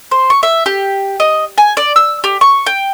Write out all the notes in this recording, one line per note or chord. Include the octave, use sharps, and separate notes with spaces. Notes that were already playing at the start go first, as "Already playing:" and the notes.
C5
C#6
E5
G4
D#5
G#5
D5
E6
G4
C#6
G5